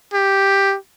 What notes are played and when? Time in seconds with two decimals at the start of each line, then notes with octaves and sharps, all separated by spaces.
0.13 G4